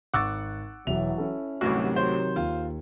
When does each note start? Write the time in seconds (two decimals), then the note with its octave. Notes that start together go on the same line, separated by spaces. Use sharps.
0.14 G#1 F#5 C#6 D6 E6 A6
0.87 E1 E3 F#3 E5 F7
1.18 C#4 E4 A4
1.61 A1 D2 G2 C3 D#3 F#3 F#4
1.96 C5 C#5
2.36 D#2 F4